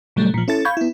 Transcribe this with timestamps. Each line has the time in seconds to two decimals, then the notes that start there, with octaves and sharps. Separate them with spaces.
0.16 A#2 C#3 F#3 G3 A3
0.34 A#2 F3
0.48 C#4 E4 A4 A6
0.65 F5 B5 C#6 G6 G#6
0.77 B3 E4